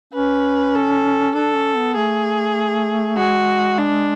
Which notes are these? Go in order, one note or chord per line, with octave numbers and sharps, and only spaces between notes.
C#4 B4
A4
D4 A4
C#4
B3
A3 G#4
G#3 F#4
D4